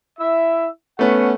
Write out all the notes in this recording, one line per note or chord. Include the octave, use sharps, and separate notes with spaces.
E4 E5
A3 B3 C#4 F#5